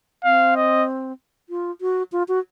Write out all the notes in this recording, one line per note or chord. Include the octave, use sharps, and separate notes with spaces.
C4 F5
D#5
F4
F#4
F4
F#4